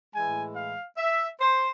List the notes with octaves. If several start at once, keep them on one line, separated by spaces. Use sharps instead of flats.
A2 E3 G#3 G#5
F5
E5
C5